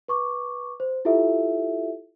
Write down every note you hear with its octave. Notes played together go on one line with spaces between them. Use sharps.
B4 C#6 D6
C5
E4 F4 G4 A4 E5